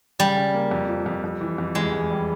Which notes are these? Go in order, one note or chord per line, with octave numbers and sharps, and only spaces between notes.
C#3 G3
C#3
A#3
F2
F3
F2
F2
E3
F2
E2 G#3
E2
G3